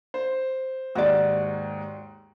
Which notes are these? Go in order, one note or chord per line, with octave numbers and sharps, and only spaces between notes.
C5
D#2 G#2 F#4 D5